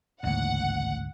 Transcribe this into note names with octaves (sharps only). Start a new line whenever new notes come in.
A1 D2 G#2 C#3 A#3 F#5